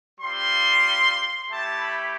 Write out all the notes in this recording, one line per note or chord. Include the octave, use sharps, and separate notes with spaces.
G3 C4 F4 C6
A3 E4 G4 A5
B5